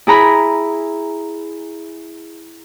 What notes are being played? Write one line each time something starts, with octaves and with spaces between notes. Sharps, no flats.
E4 G#4 A#5 B5